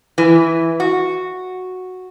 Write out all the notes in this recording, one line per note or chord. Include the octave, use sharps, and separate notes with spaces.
E3
F#4